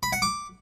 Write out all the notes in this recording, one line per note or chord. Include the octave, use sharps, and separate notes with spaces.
B5
F#5
D6